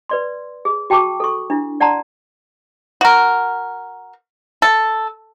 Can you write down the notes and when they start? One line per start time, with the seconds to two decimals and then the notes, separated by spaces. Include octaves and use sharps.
0.09 B4 D5 C6
0.65 G#4
0.90 F#4 G5 A5 C#6 D6
1.20 A4 C#6
1.50 D4 E4
1.80 D5 F#5 A5 A#5 C6
3.01 F#4 A#4
4.62 A4